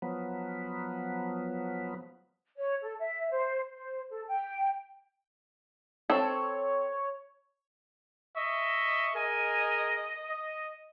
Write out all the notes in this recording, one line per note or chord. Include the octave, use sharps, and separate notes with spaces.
F3 F#3 B3
C#5
A4
E5
C5
C5
A4
G5
C4 A4 C#5
D#5 E5 C#6
G#4 A#4 D#5 G#5
D#5